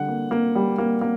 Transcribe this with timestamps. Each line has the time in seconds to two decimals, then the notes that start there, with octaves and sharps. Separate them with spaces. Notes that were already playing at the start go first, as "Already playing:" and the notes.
Already playing: D3 G3 F#5
0.08 A#3
0.31 A#3
0.55 G3
0.78 A#3
1.01 A#3